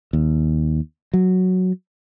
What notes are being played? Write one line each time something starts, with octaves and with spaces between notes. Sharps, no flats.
D#2
F#3